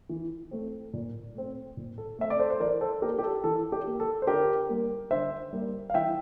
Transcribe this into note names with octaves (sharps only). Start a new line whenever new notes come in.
E3
A3 C4
A#2
A3 C4
A#2
A4
A3 C4 E5
D5
A4 C5
C5
E3 A#4 D5
A4 C5
A#3 G4 A#4
G4
A4
E3 A4
G4
A#3
A4
C5
D3 G4 A#4
G3 A#3
D3 C5 E5
G3 A#3
F5
E3 E5 G5